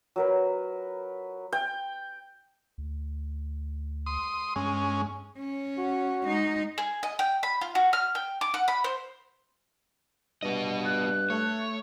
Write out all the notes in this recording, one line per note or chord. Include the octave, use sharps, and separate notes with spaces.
F#3 A#4 B4
G5
D2
C6 D#6
G2 G#3 C#4
C#4
F#4
G#3 D#4
G#4
D#5
G5
B5
F4
F#4
F6
G5
D6
F#5
B5
C5
G2 B3 D#5
F#6
A3 C#5